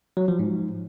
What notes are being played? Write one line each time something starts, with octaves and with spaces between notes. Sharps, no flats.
F#3
F3
G#2